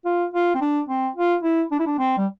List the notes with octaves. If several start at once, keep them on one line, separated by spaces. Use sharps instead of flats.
F4
F4
C4
D4
C4
F4
E4
D4
E4
D4
C4
G3